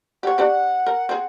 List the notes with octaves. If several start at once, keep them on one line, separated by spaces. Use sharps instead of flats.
G4 C#5 F#5
D4 F#4 G4
A#4
C4 G#4